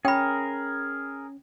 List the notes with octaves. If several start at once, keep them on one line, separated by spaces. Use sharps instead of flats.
C#4 G#4 A#4 G5 B5